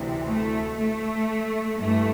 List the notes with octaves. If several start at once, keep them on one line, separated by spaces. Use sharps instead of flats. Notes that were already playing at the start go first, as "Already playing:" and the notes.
Already playing: D2 C3 E3
A3
A3
G2 E3 A3